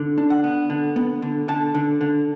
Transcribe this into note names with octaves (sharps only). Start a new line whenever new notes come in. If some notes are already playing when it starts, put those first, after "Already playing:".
Already playing: D3
D4
F#5
B3
D3
B3
D3
D3 A5
D3
D3